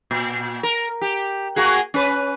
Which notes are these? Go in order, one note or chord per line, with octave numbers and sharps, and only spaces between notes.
A#2
A#4
G4
A#3 F#4 G#4
C#4 B4